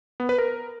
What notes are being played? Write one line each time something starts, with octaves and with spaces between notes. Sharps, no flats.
B3
B4
A#4